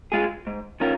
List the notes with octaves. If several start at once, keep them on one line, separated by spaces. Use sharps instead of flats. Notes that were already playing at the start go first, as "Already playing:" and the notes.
G#3 F4 G#4
G#2
D#3 C#4 F4 A#4